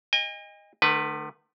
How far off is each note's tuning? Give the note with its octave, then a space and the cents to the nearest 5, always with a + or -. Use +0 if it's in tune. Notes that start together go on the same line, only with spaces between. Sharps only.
D#5 +0 G#5 -45
D3 +45 A3 +0 B4 +0